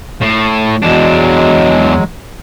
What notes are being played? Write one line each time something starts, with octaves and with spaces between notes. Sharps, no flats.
A2
E2 F#3 G#3 D4